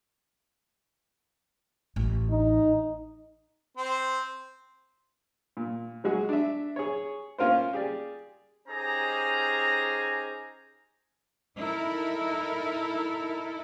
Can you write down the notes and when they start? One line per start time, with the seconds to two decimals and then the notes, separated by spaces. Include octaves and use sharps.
1.96 A1
2.30 D#4
3.77 C4
5.57 A#2
6.04 F#3 G#3 F#4 G#4
6.29 D4 E5
6.76 G#4 C#5
7.38 A#3 C#4 F4 A#4 C5
7.73 G4 G#4 D5
8.68 C#4 D#4 G4 G#4 C5 A#5
11.58 D#4 E4 A4 A#4